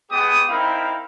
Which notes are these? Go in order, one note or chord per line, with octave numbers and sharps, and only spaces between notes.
G#3 B3 G4 G#4 D#6
C4 D#4 E4 A#4 F5 B5